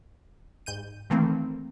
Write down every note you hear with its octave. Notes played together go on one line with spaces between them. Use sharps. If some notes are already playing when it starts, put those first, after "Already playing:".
G#2 G6 D#7
D#3 E3 A3 A#3 C4